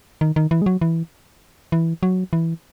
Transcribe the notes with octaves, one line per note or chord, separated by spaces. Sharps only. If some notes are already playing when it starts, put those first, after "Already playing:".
D#3
D#3
E3
G#3
F#3
E3
E3
F#3
E3